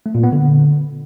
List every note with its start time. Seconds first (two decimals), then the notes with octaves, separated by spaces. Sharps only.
0.06 A3
0.15 A#2
0.24 B3
0.32 D3